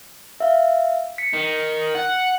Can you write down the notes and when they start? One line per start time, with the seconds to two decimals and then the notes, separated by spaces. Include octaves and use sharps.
0.40 E5 F5
1.18 B6 C#7
1.33 D#3
1.95 F#5